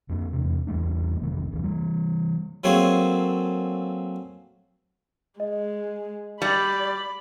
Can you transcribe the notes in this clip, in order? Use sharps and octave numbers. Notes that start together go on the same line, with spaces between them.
F2 A#3 D4
E2 C3
E2 G3 A3 D4
G1 C2 F2 D#3
F#1 D2 E3
E3 G3
F#3 A3 A#3 C4 G#4 C#5
G#3 D#5
G3 D5 B5